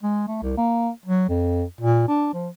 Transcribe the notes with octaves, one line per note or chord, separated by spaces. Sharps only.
G#3
A3
C2
A#3
F#3
F2
A#2
D4
F3